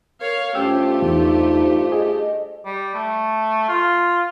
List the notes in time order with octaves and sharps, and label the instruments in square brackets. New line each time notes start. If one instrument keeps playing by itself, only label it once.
[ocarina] A#4 [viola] C#5 F5
[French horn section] G2 F4 C5 [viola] A3 G4 [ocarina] C#4 [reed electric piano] G5 E6
[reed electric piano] E2 [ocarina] D#4
[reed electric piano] G#4 [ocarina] D#5
[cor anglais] G3
A3
F4